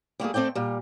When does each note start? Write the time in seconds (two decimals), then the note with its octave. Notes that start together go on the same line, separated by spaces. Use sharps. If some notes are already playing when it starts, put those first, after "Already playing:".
0.20 G3 A3 A#3 G#4
0.34 A3 C4 A4 D5 G5
0.55 A#2 G3